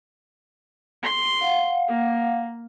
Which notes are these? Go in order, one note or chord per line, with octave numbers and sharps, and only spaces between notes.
C6
F5 F#5
A#3